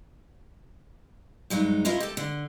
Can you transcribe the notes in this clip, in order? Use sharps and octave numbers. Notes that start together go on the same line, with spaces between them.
G2 F#3 G#3 D#4
C#4 E4 F4 A#4 D#5
G4 A4
D3